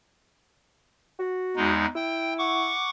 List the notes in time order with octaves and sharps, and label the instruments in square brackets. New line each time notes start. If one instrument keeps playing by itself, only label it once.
[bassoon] F#4
[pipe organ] E2 G#3 D#4
[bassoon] E4 [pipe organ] G5
[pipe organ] F#5 C#6 D6